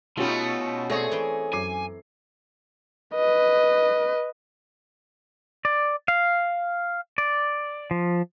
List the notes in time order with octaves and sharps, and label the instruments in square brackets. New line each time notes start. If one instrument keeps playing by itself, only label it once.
[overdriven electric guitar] B2 [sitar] A3 C#4 D#4 [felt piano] F4 G4 B5
[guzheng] A3 C4 [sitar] G#4 C#5 [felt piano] D5 G#6 A#6
[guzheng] E3 G5
[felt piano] F#2 D6 C7 [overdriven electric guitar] G#5
[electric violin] B4 D#5
[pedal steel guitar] D5
F5
D5
F3